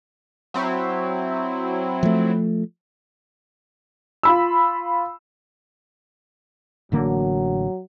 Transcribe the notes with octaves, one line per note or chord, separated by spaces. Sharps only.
F#3 C4 E4
F3 A3
F4 B5 E6
A1 D3 F#3 A#3